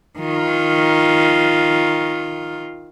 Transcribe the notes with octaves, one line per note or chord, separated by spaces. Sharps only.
D#3 F4